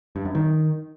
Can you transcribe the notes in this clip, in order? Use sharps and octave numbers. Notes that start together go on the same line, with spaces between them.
G2
F#2
D#3